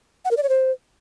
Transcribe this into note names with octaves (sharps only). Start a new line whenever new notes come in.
F#5
A#4
D5
C#5
C5